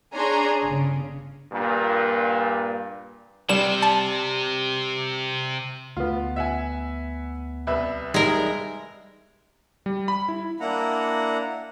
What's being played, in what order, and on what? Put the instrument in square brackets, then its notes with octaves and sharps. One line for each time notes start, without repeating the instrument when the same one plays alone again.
[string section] D4 G#4 C#5 G#5 A#5 C6
G1 C#3
[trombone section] G2 A#2
[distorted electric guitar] C3 [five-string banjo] G3 [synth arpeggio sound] E7
[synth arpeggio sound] A5
[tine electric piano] D2 B3 [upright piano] F4
[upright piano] E5 F#5 G#5
C2 B4 E5
[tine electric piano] G3 D#4 G#4 [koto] G#3 A#4
[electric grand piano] G3
B5
E4
[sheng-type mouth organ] A#3 D4 E4 F#5 A#5